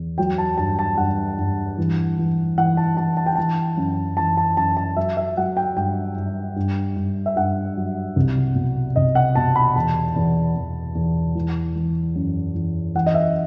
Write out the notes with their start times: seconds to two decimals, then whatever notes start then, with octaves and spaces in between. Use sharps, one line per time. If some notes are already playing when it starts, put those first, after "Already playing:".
Already playing: E2
0.18 F#3 G5
0.38 A5
0.58 G2 A5
0.79 A5
0.97 G2 F#5
1.39 G2
1.78 E3
2.18 E3
2.58 E3 F#5
2.77 A5
2.97 E3 A5
3.17 A5
3.26 G5
3.35 E3 A5
3.77 F#2
4.17 E3 A5
4.37 A5
4.57 F#2 A5
4.77 A5
4.96 F#3 E5
5.17 E5
5.37 F#3 F#5
5.57 G5
5.76 G2 G5
6.17 G2
6.56 G2
6.96 G2
7.26 E5
7.36 G2 F#5
7.77 F#3
8.16 C2
8.56 B2
8.96 C2 D#5
9.15 F#5
9.35 B2 A5
9.56 B5
9.75 E2 A5
10.16 E2
10.56 E2
10.95 E2
11.35 E3
11.75 E3
12.16 F#2
12.55 E3
12.95 E3 F#5
13.06 D#5
13.14 E5